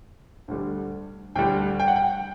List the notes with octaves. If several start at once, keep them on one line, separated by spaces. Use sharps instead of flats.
D2 D3 G3
D2 D3 G3 G5
G5
F#5
G5